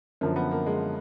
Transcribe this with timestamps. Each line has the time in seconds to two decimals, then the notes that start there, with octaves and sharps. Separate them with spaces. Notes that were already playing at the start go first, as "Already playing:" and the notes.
0.21 F#2 D3 F3 A#3
0.36 B3
0.51 A#3
0.66 G#3